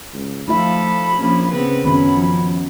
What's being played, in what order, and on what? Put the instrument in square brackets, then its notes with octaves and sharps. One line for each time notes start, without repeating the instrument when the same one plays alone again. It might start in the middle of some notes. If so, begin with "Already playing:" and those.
[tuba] C#2
[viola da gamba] F3 A4 [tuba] A3 [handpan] D#4 F4 E5 [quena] B5
[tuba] A#1 [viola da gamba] F3 A#3 C#4
[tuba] C#3 [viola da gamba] B3 C4 B4
[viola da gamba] F#2 [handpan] D#3 B3 C#4 [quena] B5
[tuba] F3